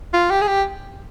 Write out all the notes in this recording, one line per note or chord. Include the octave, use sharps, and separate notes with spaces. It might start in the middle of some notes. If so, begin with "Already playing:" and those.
F4
G4
G#4
G4